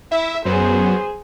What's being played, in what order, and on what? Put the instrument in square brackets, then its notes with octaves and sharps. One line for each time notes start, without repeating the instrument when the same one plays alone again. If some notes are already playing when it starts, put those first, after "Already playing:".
[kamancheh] E4 [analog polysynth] E5
[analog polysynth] F#2 F#3 B3 [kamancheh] G#4 C5